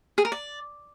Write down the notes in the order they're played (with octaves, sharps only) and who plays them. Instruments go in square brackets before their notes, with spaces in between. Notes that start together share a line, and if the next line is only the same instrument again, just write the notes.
[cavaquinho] G#4
A#4
D5